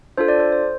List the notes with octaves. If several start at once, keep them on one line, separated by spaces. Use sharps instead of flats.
D4 F4 A4 C5
D5
C5
C5